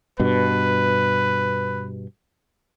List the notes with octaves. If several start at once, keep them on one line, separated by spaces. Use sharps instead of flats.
G2 B2 B4